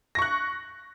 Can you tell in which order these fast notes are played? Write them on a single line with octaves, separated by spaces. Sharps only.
A#6 C#6 F#6